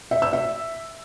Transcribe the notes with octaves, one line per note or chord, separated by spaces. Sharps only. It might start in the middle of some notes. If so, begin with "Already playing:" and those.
E5
E6
E5